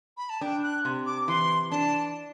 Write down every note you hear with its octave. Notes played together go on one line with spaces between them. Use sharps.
B5
A5
D4 G5
F#6
C3
D6
E3 C6
D4 A5